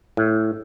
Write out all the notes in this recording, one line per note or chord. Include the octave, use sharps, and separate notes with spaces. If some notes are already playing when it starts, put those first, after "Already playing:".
A2